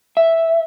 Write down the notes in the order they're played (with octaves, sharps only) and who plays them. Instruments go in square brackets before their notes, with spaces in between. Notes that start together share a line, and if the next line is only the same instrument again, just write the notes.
[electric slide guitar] E5